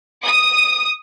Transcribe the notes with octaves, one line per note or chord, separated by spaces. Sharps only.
D#6